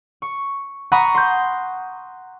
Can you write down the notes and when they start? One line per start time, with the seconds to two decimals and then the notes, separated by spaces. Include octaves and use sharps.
0.22 C#6
0.92 F#5 A#5 B5 C#6 D#6
1.15 C6 G6